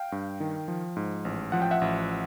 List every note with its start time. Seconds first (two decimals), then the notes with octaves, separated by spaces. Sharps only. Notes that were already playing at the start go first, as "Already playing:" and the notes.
Already playing: F5 G5
0.12 G2
0.40 D#3
0.68 F3
0.96 G#2
1.25 A1
1.52 F3 F#5
1.62 G5
1.71 E5 F#5
1.81 A1